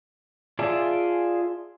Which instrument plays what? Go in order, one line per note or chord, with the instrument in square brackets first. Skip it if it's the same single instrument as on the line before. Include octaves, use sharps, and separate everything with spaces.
[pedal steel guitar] F4 G#4 D5 E5 A5